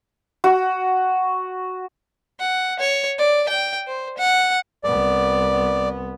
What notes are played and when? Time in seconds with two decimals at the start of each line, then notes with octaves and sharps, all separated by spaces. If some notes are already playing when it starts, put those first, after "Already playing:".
0.44 F#4
2.40 F#5
2.80 C#5
3.19 D5
3.49 G5
3.88 C5
4.18 F#5
4.84 C2 B3 D5